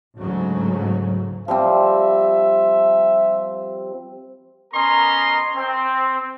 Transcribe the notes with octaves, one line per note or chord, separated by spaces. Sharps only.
D2 G#2 C#3 F#3
F3 G3 C4 E5
B3 C#4 A#4 D#5 A#5 C6
C4